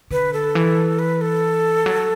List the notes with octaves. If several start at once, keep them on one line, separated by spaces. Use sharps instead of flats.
D3 B4
A4
E3
B4
A4
F#3